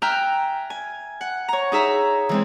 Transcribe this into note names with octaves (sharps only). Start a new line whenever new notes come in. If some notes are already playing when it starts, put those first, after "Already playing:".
E5 G5 G#5 A#5 F6 F#6
G#5
F#5
C#5 A#5
D#4 G#4 E5 A#5
E3 G#3 C4